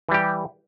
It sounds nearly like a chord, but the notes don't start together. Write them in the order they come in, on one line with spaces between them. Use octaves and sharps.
E3 G3 G4